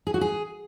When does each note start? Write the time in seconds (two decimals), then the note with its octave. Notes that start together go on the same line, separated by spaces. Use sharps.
0.07 G#4
0.14 F#4
0.21 G#4